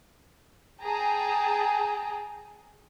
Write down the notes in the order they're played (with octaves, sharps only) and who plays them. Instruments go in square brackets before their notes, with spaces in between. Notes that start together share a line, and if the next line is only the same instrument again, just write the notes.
[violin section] G#4 G5 A5 A#5